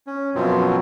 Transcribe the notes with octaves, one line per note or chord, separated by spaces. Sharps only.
C#4
F#2 B2 F3 F#3 B3 C4